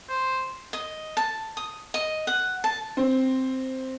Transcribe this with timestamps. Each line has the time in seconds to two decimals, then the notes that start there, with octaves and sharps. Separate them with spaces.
0.09 C5
0.73 D#5
1.17 A5
1.57 D#6
1.94 D#5
2.27 F#5
2.64 A5
2.97 C4